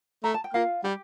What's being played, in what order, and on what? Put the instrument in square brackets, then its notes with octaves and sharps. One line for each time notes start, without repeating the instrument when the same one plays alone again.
[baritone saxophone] A3 [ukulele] A#5
[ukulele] A5
G5
[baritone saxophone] A#3 [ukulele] F4 F5
[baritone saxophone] G3 [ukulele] G4 G5